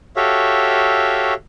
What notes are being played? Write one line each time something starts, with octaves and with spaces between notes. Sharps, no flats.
F#4 G4 A4 C#5 E5 F5